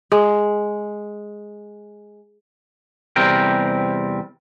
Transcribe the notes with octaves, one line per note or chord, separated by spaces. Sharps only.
G#3 G#4
E2 C3 G3 C4 A#4 G5